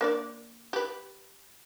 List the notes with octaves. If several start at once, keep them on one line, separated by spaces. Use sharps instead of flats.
A#3 D4 D5
G4 B4